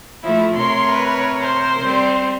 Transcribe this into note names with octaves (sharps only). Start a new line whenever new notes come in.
F3 A3 E4
C3 A#4 C#5 C6
B4
C5
G3 C4